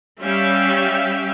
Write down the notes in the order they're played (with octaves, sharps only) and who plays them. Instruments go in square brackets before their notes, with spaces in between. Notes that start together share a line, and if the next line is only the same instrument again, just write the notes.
[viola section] G3 C#4 E5 F5 G5